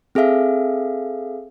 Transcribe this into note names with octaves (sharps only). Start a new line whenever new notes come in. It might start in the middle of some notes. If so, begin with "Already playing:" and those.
C4 G#4 A4 E5 F5